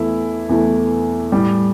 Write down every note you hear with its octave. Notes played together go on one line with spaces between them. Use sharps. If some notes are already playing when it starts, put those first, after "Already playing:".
Already playing: E2 E3 A3 E4
E2 E3 A3
A2 G3